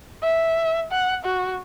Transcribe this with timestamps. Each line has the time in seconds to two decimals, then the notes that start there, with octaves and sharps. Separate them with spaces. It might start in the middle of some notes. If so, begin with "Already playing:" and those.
0.24 E5
0.91 F#5
1.25 F#4